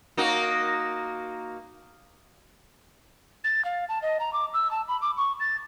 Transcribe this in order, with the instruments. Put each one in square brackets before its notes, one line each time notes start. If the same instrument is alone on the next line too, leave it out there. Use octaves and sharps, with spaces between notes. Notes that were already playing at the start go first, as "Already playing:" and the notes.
[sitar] A#3 D#4 F#4
[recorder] A6
F5
A5
D#5
A#5
D6
E6
A5
B5
D6
C#6
A6